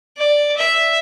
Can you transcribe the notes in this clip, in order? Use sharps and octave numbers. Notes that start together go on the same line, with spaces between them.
D5
E5